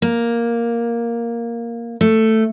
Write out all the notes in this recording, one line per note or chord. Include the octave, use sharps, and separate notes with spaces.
A#3
A3